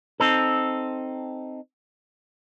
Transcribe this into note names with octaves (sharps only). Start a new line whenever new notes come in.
C4 D#4 A4